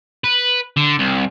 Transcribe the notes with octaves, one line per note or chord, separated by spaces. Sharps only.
B4
D3
C2